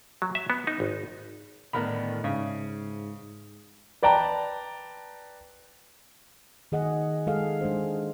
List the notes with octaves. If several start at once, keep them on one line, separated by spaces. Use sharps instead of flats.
F#3
E5
B3
D#4
G#1
A2 D3 D#3 B3 A#4 B5
G#2 C#3 E5
B4 D5 G5 A5 A#5
D#3 G#4 D#5 F#5
G#3 G#4 A4 F5
G#3 D4 C5